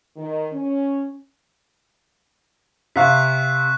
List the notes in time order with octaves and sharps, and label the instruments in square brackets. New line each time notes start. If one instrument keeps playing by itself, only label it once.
[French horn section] D#3
C#4
[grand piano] C3 F5 [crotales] C#6 F#6 B6